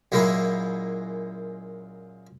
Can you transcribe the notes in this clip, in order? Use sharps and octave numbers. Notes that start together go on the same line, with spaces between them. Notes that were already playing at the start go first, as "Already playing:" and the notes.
F#2 A#2 G#3 A#3 E4